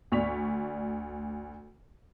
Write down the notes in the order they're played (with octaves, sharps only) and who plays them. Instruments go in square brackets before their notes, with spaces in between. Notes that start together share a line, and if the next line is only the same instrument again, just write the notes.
[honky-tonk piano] D2 D5 C#6 B6 F7